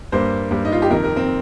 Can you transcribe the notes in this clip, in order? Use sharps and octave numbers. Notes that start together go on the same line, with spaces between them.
G2 G3 A#3 C5
G2 G3 A#3
D#4
F4
G4
F2 C3 D#3 A#4
A#4
C4